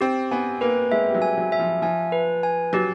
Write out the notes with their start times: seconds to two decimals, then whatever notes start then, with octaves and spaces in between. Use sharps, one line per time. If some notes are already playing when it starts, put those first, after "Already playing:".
0.01 C4 G4
0.31 B3 G#5
0.61 A#3 B4
0.92 G#3 E5
1.09 G3
1.14 F#3
1.22 G#5
1.38 F#3
1.52 E5
1.59 F3
1.82 F3 G#5
2.12 B4
2.43 G#5
2.73 F#3 G4